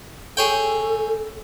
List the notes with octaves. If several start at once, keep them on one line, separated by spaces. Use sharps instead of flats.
G#4 A4 C#5 G5